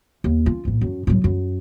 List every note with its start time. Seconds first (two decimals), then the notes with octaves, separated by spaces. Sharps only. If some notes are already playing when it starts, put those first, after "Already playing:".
0.24 D#2
0.46 C#4 F4
0.65 A#1 A2
0.81 F#2
1.07 A2 F#3
1.24 F#2